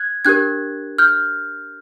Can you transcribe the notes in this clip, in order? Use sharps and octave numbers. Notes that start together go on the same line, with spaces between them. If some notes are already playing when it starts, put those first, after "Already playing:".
Already playing: F#6 G#6
D4 G4 A#4 F#6 G#6
F6 G6